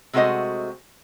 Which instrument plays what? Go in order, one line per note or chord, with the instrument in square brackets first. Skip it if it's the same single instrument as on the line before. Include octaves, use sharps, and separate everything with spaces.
[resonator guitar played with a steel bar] C3 G#3 A3 F#4 C5 D#5